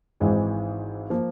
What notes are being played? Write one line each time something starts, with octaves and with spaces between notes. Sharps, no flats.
G#1 G#2 E3 G#3 C4
F3 A#3